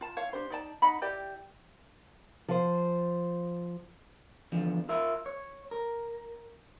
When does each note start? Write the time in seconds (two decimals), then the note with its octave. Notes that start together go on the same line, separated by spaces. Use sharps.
0.01 F4 A5
0.17 E4 C#5 F5
0.33 D4 G4 C5
0.50 D#4 D5 A5
0.82 D#4 D#5 F#5 B5
1.01 E4 G4 D5 G5
2.48 F3 C5
4.52 E2 D3 F3
4.89 F4 A#4 E5
5.26 C#5
5.71 A#4